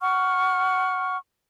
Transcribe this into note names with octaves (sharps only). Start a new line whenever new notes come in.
F#5 C#6 F6